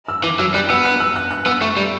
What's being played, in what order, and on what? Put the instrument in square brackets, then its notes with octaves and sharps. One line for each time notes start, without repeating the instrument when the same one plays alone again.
[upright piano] E6
[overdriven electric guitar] E3 [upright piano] D6
[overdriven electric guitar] F#3 [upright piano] E6
[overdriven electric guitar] G3 [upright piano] F#6
[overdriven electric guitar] B3 [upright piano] E6
[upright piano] F#6
E6
F#6
F#6
[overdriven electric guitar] B3 [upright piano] E6
[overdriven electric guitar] A3 [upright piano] C#6
[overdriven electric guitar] G3